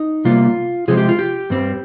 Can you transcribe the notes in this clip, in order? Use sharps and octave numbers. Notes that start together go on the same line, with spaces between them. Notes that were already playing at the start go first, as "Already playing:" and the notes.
Already playing: D#4
C3 G3 A#3 F4
C3 F3 G#3 C4 G#4
G4
F4
G4
G2 G3 C4